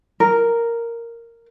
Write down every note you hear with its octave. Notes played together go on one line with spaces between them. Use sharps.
A#4